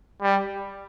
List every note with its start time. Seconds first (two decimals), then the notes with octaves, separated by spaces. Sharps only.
0.22 G3